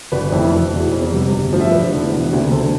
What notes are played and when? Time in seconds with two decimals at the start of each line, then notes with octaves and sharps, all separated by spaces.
0.12 G1 B4 D5
0.32 F2 E3 A3
0.52 E1
0.72 E2 B2
0.92 F2
1.12 C3 G3 B3
1.32 G1
1.52 G2 F3 A3
1.61 E5
1.72 E1 B4 D5
1.92 E2 D3 A3
2.11 E1
2.31 D2 C3
2.52 D2 A4 C5